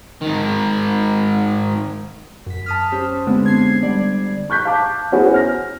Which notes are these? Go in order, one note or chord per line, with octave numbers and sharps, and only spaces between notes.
G#2 D#3
F#2 B6
A5 D#6 F6
C#4 G4 C5
D3 G#3 B3 C4 D4
G#6 C7
D3 G3 D5
C#6 F#6 G6 B6
F5 A5 D6
B3 C#4 E4 F#4 G#4 C5
F6 A#6